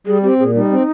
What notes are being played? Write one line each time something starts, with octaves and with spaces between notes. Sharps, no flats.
G3 G#4
C4 G4
A#2 G#4
G3 D#4
C4